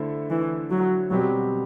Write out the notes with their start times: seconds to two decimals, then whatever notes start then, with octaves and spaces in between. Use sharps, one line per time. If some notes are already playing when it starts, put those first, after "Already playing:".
Already playing: D3 A3 E4 A4 C5
0.30 E3
0.71 F#3
1.11 B2 F#3 G3 C4 G4